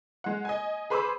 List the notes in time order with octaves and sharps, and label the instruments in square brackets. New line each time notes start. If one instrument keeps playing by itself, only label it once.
[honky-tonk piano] G#3 F#5
D#5 G#5
G#4 B4 C5 B5 D6 E6